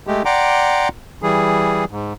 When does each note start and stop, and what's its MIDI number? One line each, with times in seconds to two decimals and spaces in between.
0.07 0.23 56
0.07 0.23 57
0.07 0.23 67
0.25 0.89 74
0.25 0.89 78
0.25 0.89 79
0.25 0.89 82
0.25 0.89 84
0.25 0.89 86
1.23 1.85 52
1.23 1.85 55
1.23 1.85 68
1.91 2.13 44